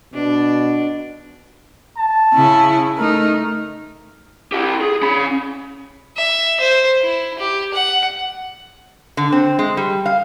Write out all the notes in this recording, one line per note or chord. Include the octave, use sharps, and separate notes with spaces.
B2 D4
A5
C#3 E4
A3 D#4 A#4
E4 G4
G#4
C#4 B5
E5
C5
E4
G4
F#5
D3
C4
G#3
G3
F5